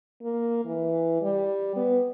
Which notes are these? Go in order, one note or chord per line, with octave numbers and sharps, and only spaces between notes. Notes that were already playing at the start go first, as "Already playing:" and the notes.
A#3
E3
G3
B3